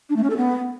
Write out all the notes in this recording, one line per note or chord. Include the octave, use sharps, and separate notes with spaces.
D4
A3
C#4
A4
B3